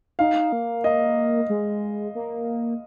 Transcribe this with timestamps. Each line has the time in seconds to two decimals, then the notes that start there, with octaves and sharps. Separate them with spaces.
0.19 D#4 F5
0.52 A#3
0.84 D#5
1.49 G#3
2.15 A#3